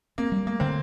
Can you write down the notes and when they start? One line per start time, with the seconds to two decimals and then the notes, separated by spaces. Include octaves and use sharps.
0.18 A#3 C4
0.32 G3
0.47 A3 A#3
0.60 D3 C4